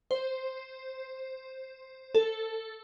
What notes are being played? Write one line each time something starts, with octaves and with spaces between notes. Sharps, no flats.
C5
A4